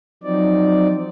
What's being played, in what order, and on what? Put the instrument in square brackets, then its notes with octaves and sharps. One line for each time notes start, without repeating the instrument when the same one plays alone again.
[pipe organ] F3 F#3 C4 D#4 D5